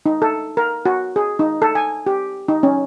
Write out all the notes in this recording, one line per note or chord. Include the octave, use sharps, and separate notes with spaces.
D#4
A4
A#4
F#4
G#4
D#4
A4
G#5
G4
D#4
C#4